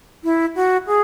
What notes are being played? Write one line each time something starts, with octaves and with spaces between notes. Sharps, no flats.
E4
F#4
G#4